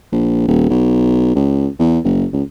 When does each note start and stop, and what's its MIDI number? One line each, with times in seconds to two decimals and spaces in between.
0.12 0.44 34
0.48 0.67 27
0.70 1.32 35
1.35 1.68 37
1.79 1.99 40
2.04 2.25 30
2.33 2.43 37